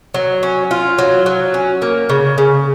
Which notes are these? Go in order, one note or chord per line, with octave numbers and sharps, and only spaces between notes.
F#3
C#4
F4
F#3
F#3
C#4
A#3
C#3
C#3